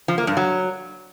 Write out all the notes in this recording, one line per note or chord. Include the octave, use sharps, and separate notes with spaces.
F3
A#3
G2
F#3